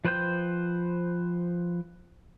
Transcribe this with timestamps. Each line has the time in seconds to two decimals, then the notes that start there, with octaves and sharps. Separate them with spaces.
0.05 F3 B4 C5 G5 G6